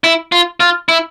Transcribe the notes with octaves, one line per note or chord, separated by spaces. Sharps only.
E4
F4
F4
E4